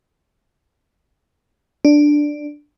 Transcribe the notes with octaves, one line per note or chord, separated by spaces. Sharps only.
D4